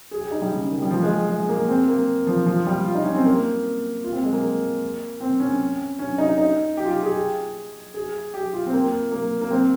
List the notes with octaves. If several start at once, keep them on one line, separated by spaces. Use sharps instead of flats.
G#4
G4
D#4
G3
C#3
D#3
G3
F3
G#3
G#3
A#3
C4
A#3
F3
F3
G3
F4
D#4
C#4
C4
A#3
F4
C4
G#3
A#3
C4
C#4
C#4
D#4
D#4
G4
F4
G4
G#4
G#4
G4
F4
C4
A#3
A#3
A#3
C4